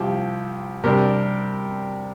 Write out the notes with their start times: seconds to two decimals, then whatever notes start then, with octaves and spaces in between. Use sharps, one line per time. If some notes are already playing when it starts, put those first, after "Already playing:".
Already playing: C2 C3 F3 G4
0.84 C3 G3 D4 G4 A#4